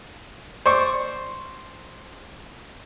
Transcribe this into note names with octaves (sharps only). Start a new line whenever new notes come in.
C5 D5 C#6